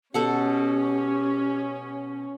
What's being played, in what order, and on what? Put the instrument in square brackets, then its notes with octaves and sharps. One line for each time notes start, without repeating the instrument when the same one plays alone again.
[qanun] B2 A4 F#5 [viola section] C#4 [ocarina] G4